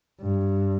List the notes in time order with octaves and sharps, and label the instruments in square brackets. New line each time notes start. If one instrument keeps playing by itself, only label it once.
[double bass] G2